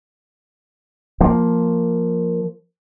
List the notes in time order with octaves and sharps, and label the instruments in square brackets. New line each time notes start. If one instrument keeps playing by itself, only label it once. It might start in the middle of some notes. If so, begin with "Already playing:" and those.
[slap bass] F3 A#3